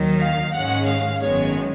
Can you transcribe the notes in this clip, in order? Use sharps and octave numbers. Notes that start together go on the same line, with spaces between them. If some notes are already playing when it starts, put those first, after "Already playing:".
Already playing: D#2 D#3 F#3
F5
G#2 D#3 G#3 C#4 F#5
F5
G#1 F#2 D#3 G#3 B3 C#5